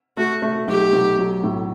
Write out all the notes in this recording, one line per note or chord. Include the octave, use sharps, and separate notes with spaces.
A3 F#4
A3
B1 G4
B1
F#3
A2